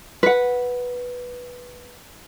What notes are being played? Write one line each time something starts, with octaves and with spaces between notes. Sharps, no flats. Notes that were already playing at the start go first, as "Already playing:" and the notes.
B4 F#5